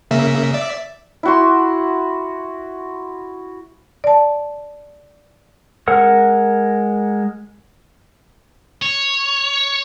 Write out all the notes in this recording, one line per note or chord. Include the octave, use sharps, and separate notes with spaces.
C#3 A#3 E5
D5 E5
E4 F#4 C6
D5 A5
G#3 A#4 F#5 E6
C#5